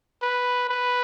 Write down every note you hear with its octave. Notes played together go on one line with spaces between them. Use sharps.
B4
B4